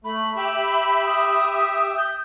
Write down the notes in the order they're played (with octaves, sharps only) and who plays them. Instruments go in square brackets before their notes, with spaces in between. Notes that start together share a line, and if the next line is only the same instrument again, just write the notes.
[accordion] A3 [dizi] B5
[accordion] G4 E5
[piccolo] D#6
[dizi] G6